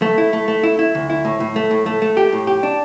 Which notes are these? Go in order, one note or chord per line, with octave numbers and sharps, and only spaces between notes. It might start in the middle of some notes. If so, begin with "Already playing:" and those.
A3
E4
A3
A3
E4
E4
D2
E4
A2
A2
A3
A2
A3
A3
G4
A2
G4
D4